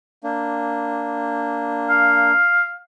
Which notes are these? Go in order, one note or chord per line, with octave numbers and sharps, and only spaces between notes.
A#3 D4
F5